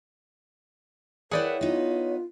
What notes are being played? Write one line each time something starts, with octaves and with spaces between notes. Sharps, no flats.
E4 G#4 A#4 B4 C#5 D5 F#5 G5
B3 D#4 F4